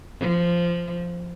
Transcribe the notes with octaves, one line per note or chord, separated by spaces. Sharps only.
F3